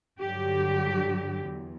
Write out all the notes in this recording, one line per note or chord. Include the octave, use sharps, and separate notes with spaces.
G2 D3 F#3 G4
E2